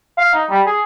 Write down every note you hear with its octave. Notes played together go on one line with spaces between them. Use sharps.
F5
D#4
G3
G#4